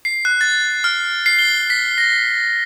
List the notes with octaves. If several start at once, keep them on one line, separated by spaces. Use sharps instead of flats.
C7
F#6
A6
F6
C7
G7
B6
A#6